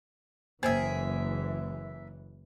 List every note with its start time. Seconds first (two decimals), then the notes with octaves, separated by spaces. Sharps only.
0.63 F#1 E3 A#3 G#4 A#4 C5 E5